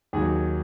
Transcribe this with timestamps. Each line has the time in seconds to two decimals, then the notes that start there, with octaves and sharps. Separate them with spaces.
0.13 D#2 D#3 F#3 G#4